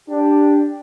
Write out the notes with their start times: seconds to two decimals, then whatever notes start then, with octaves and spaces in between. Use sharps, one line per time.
0.09 D4 G4